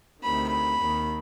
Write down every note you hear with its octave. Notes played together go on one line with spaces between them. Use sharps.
D2 C3 D#3 B5
B5
D#2 D#3